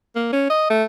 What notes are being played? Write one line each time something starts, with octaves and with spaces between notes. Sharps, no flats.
A#3
C#4
D#5
A3